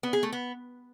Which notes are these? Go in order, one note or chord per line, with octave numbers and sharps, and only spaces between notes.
B3
G#4
A3
B3